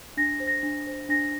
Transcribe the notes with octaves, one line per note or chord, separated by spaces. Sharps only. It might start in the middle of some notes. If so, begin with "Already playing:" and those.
D4 A#6
C5
A#6
D4
C5
D4 A#6